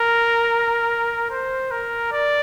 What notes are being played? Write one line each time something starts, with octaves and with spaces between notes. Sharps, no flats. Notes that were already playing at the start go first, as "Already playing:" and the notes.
Already playing: A#4
C5
A#4
D5